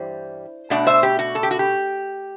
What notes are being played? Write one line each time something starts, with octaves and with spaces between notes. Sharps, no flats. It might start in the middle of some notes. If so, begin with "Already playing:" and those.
Already playing: G2 E3 G3 C5
B2 A3 D4 D5 F#5
C5 E5
G4
F#4
A4
G4
F#4
G4